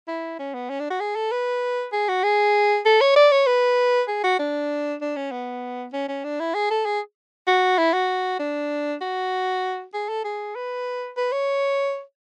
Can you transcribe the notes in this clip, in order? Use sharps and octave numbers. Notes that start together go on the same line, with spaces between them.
E4
C#4
B3
C#4
D4
F#4
G#4
A4
B4
G#4
F#4
G#4
A4
C#5
D5
C#5
B4
G#4
F#4
D4
D4
C#4
B3
C#4
C#4
D4
E4
G#4
A4
G#4
F#4
E4
F#4
D4
F#4
G#4
A4
G#4
B4
B4
C#5